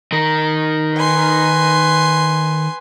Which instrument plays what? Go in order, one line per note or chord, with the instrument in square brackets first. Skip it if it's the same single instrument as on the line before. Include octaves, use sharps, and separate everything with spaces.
[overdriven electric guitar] D#3 A#4
[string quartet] B4 G#5 C6